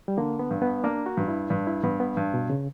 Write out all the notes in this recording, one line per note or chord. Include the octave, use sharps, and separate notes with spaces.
G3
D3 A#3
B3
G2
B3
A#3 D4
F#4
G2
D4
E4
G2 D4
E4
G2 B3
B3
G2
B2
C#3